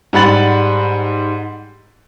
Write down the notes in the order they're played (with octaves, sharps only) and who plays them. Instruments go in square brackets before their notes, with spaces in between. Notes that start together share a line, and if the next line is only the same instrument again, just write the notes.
[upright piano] G#2 G3 F#5 B5 A6 F#7